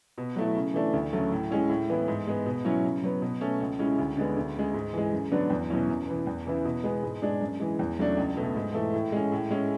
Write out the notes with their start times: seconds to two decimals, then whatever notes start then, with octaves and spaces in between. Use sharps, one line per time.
0.18 B2
0.36 F#3 A3 E4
0.55 C#3
0.74 E3 A3 D4
0.93 D2
1.13 C#3 F#3 A3
1.32 A2
1.51 G#3 C#4 E4
1.69 A2
1.89 E3 B3 E4
2.08 G#2
2.27 G#3 B3
2.46 B2
2.65 F#3 C#4 E4
2.84 C#3
3.03 F#3 B3
3.22 B2
3.41 A3 C#4
3.60 C#2
3.79 C#3 G#3 C#4 E4
3.98 D2
4.17 D3 G#3 B3
4.37 D2
4.55 C#3 G#3
4.74 G#2
4.93 E3 G#3
5.12 F#2
5.32 D3 F#3 B3 D4
5.50 E2
5.70 B2 F#3 C#4 E4
5.89 F#2
6.08 E3 B3
6.27 E2
6.45 C#3 E3 B3 E4
6.65 B2
6.84 G#3 B3
7.03 G#2
7.22 G#3 D4
7.41 F#2
7.60 E3 G#3
7.79 E2
7.98 C#3 F#3 A3 D4
8.17 C#2
8.37 B2 A3
8.56 G#2
8.74 E3 A3
8.94 A2
9.12 G#3 C#4
9.32 A2
9.50 G#3 C#4 E4